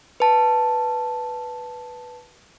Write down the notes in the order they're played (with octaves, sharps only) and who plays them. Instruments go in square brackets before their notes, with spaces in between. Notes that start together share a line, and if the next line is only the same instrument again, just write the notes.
[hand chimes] B4 A5